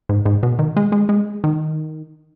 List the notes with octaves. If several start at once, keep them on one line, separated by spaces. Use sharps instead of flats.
G#2
G#2
B2
D#3
G#3
G#3
G#3
D#3